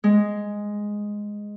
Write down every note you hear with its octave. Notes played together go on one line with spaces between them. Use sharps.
G#3